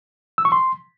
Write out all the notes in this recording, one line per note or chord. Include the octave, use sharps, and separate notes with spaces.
E6
C#6
C6